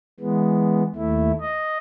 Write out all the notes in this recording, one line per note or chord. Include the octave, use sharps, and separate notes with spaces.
E3 G#3 B3
D#2 A3 E4
D#5